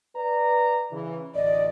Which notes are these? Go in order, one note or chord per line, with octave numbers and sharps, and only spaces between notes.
B4 D5 A#5
C#3 E3
A1 D2 D5 D#5